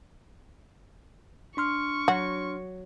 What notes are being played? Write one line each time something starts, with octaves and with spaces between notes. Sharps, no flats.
D4 C6 C#6 F6
F#3 F#4